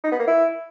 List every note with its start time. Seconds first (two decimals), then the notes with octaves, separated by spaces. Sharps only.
0.04 D#4
0.12 B3
0.20 A#3
0.28 E4